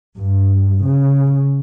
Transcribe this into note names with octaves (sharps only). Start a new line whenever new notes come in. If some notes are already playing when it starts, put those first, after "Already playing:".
G2
C#3